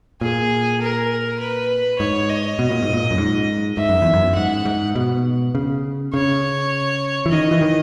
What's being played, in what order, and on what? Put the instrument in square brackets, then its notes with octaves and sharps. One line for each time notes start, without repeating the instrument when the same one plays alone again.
[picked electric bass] A#2 [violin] G#4
[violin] A#4
B4
[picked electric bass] G#2 [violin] C#5
[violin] D#5
[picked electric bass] B2
A#2
G#2
A#2
F#2
G#2
[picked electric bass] G#2 [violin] E5
[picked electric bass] F#2
E2
F#2
[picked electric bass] G#2 [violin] F#5
[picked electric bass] G#2
B2
C#3
[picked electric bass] C#3 [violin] C#5
[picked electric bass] E3
[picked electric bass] D#3 [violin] D#5
[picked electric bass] E3
D#3